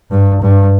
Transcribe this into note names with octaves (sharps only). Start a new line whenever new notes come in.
G2
G2